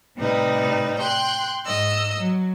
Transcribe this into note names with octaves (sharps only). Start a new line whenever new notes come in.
A2 C3 G3 D#4 B4
G5 C6 F#6
G#2 D#5 E6
F#3